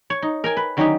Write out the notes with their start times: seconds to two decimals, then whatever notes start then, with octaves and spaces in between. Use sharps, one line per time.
0.10 C#5
0.22 D#4
0.44 A#4 G5 G#5
0.57 B4
0.77 D3 D#3 F#3 C#4 D#4 G4